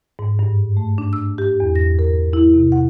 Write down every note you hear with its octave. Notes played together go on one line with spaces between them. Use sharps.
G#2
G2
A3
D4
E6
G4
E2
A#6
A#4
E4
C3
F#5